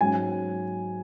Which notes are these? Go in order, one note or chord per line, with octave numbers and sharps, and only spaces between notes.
G#2 F#3 C#4 G#5